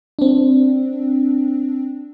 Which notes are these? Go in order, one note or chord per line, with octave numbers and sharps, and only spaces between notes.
C4 D4